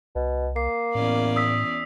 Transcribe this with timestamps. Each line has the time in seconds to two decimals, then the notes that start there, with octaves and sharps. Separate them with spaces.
0.15 C2 B2
0.56 A#3 C7
0.95 E2 A2 C#4 D5
1.36 D#6 E6 B6